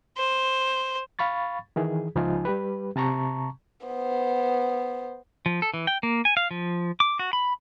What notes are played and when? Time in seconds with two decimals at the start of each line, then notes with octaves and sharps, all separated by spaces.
0.17 C5
1.19 F5 B5 C#6 A6
1.76 D#3 E3 G#4
2.15 C#2 F3 D#4 F4 G#5
2.45 G3 G4 B4
2.96 C3 A5 A#5 C#6
3.87 B3 C5
5.46 F3
5.62 A4
5.74 E3
5.87 G5
6.03 A#3
6.25 G#5
6.37 F5
6.51 F3
7.00 D6
7.19 F#4
7.33 B5